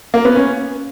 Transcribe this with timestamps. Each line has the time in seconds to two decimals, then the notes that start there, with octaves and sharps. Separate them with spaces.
0.14 A#3
0.25 B3
0.36 C#4